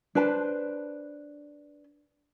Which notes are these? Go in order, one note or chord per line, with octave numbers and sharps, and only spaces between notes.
D4 B4 C5 A5